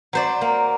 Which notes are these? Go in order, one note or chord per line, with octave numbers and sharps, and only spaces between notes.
F#3 C5 D5
A#3